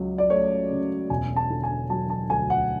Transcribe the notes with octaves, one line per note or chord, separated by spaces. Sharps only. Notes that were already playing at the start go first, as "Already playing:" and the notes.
Already playing: C#2 F#3
D5
A3 C#5
C#3
E1 G#5
A5
D3
G#5
F#3 A5
A5
D2 G#5
F#5